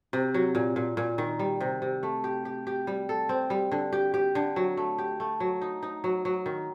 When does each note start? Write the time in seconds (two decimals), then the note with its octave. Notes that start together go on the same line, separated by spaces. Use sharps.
0.13 C3
0.34 F#3
0.55 A#2
0.76 A#2
0.97 A#2
1.18 D#3
1.39 G3
1.60 C3
1.82 C3
2.03 A3
2.24 G4
2.45 G4
2.67 G4
2.87 G3
3.09 A4
3.29 C4
3.50 G3
3.72 D3
3.93 G4
4.14 G4
4.35 D3
4.56 F#3
4.77 A3
4.98 G4
5.20 A3
5.40 F#3
5.61 D#4
5.83 D#4
6.04 F#3
6.25 F#3
6.46 D#3